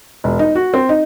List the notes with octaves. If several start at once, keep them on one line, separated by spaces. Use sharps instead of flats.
E1
D#4
F#4
C4
D#4